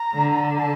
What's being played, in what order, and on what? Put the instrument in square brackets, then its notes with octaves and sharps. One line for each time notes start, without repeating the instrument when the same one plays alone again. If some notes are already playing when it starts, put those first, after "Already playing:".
Already playing: [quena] A#5
[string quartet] D3
[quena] A5